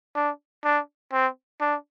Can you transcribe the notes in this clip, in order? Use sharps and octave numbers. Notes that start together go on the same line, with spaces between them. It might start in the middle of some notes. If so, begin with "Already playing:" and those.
D4
D4
C4
D4